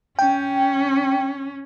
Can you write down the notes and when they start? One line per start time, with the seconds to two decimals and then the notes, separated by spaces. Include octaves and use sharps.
0.19 C#4 G5